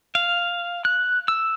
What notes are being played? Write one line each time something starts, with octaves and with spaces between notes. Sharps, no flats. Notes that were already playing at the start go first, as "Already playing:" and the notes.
F5
F#6
E6